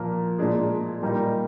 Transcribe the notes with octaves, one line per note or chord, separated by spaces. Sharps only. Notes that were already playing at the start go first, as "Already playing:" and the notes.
Already playing: A#2 F3 A#3
A#2 G#3 D4 G#4
A#2 G3 A#3 D#4